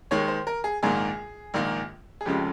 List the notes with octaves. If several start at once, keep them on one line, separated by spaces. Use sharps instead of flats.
D#2 D#3 G#3 C#5
C5
A#4
G#4
A#1 G#2 D#3 A#3 G#4
A#1 G#2 D#3 A#3
G#4
F1 F2 C#3 F3 G#3 G4